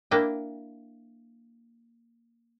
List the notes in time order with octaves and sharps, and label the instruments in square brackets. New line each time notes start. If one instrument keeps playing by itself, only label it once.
[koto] A#3 D4 E4 G5